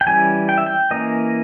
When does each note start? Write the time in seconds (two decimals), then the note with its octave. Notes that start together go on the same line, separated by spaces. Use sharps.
0.01 G5
0.07 E3 G3 C#4 G#5
0.49 G5
0.58 E5
0.66 G5
0.91 E3 A#3 C#4 D#5